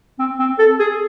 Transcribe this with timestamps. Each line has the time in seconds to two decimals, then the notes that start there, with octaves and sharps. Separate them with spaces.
0.19 C4
0.39 C4
0.59 A4
0.79 G#4